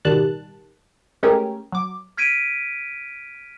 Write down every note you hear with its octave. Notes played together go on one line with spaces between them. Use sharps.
A1 B2 D#3 G3 A5 F#6
G#3 A3 C#4 G4 G#4 A#4
F#3 D6
F6 G#6 B6 D7 D#7